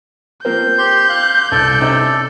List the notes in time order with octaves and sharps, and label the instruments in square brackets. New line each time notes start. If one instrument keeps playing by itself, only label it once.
[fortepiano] F3 A#3 C4 [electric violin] G6
[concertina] G4 C6
F5 F#6
[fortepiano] C2 [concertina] A4 D5
[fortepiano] C3 C#4 D#4